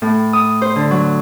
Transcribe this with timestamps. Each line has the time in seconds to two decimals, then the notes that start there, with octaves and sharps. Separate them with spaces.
0.02 A2
0.33 D#6
0.62 C5
0.76 D3
0.91 F#3